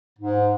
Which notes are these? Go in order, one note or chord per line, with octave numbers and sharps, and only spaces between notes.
G#2